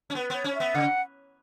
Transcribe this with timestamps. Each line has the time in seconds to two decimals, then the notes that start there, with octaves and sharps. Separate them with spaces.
0.10 C#4
0.15 B3 B4
0.30 B3 C#5
0.44 C#4
0.55 E5
0.60 B3
0.74 C#3 F#5